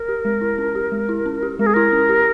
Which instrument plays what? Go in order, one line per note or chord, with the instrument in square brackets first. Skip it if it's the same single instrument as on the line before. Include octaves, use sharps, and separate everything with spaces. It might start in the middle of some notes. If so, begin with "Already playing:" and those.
Already playing: [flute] A#4
[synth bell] G4
G#3
E4
C#4
G4
G#3
E4
C#4
G4
[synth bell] G#3 [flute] A#4
[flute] G#4
[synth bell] E4 [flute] A#4
[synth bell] C#4
G4